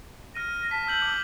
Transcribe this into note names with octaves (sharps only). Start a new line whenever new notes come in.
F6 A#6 D#7
A5 B6
E6 G6 F#7
D6 E6